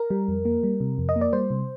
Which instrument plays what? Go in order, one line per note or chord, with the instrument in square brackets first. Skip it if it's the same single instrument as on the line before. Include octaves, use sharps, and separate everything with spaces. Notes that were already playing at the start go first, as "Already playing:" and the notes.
Already playing: [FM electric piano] A#4
G3
F2
A#3
G3
C3
F2
D#5
A#3
D5
G3 C5
C3